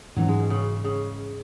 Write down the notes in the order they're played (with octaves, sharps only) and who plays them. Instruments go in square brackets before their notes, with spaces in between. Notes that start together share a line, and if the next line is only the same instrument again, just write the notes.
[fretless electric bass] G#2 E3 C#4 [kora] F#3
[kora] G#3
B2
C#3
C#3